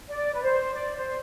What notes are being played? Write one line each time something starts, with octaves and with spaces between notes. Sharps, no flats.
D5
B4
C5
D5
C5